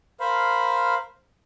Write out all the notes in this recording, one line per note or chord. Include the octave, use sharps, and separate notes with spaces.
A#4 C5 F5 B5